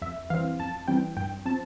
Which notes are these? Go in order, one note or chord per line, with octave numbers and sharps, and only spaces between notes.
F2 E5
E3 G3 C4 F5
F2 A5
E3 G3 C4 G5
G2 G5
F3 C4 A5